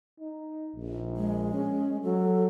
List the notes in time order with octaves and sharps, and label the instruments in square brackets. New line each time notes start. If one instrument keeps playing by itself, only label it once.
[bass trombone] D#4
A#1
[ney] G#3
[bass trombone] C#4
[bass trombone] F#3 [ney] A4